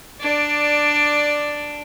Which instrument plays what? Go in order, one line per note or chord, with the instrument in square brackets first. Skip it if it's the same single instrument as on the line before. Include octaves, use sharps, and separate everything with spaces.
[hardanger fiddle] D4 D5